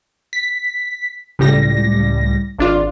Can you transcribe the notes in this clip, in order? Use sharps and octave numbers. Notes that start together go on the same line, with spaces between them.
B6
C#2 A2 G3 A#6
G#1 D4 F4